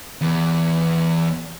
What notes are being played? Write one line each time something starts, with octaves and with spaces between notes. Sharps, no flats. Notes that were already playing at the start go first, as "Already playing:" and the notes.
E2